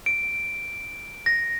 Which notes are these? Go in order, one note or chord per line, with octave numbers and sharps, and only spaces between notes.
D7
A#6